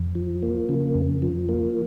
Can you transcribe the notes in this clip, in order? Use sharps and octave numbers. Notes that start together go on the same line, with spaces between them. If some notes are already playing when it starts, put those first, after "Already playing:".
Already playing: F2
F3
A#3
C#3
F2
F3
A#3